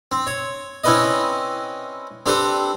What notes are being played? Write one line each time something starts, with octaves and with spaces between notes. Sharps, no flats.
C4
C#5
C4 C#4 E4 B4 D5 D#5
C4 D4 G4 A4 B4 C5